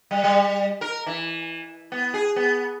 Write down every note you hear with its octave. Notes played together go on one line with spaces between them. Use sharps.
G3
G3
A#4
E3
B3
G#4
B3